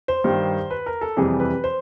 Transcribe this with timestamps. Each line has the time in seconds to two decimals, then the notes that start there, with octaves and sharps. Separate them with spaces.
0.08 C5
0.24 G2 D#3 G3
0.71 B4
0.86 A#4
1.01 A4
1.17 F2 C3 E3 G3 G#4
1.40 B4
1.64 C5